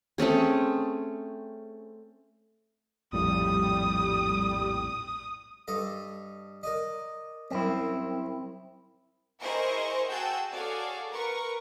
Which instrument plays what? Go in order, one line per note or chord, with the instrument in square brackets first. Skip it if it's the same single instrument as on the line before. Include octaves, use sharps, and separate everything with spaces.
[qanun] A3 C4 C#4 G#4
[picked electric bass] A#1 F2 A2 [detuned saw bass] G3 [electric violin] D#6
[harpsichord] G2 A4 D#5
A#4 D5 D#5
[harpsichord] C2 F#2 [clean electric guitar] C4 E4
[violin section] E4 G#4 A#4 C5 D#5 C#6
F#4 G#4 G5 A5 E6 G6
F#4 G#4 A4 C#5 D5 F5
A#4 B4 C#6